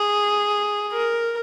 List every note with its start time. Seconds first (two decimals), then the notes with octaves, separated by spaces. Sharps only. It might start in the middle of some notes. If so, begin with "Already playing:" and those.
Already playing: G#4
0.92 A#4